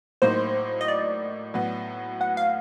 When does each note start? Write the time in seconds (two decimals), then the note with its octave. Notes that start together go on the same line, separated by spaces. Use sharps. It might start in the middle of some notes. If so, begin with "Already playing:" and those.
0.22 A2 F#3 A#3 D#4 C5
0.81 D#5
0.88 D5
1.54 A2 F#3 B3
2.21 F#5
2.37 F5